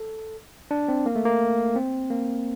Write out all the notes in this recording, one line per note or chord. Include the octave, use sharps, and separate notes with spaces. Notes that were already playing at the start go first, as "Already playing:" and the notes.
Already playing: A4
D4
C4
A#3
A3
A#3
C4
A#3